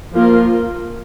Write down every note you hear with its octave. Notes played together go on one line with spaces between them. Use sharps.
F3 A#3 F4 A#4